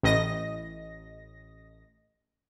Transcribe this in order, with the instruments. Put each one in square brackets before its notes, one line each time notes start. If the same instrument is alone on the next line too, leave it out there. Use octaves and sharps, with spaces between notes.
[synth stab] A1 D#5 A#6